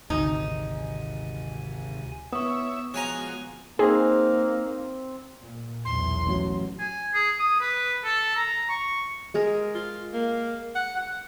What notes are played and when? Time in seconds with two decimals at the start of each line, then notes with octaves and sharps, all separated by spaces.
0.10 G#1 D2 C3 D#4 G#5
2.33 B3 E4 C#5 E5 C#6 D#6
2.94 F3 G#3 F#4 C#5 G#5 A#5
3.79 A#3 C4 D#4 G#4
5.40 A#2
5.85 B1 E2 C6
6.27 A1 F#3
6.80 G#5
7.14 G#4
7.39 D#6
7.61 B4
8.04 A4
8.36 A#5
8.69 C#6
9.34 G#3 G#4 A#4
9.75 F4
10.14 A#3
10.76 F#5
10.96 F#5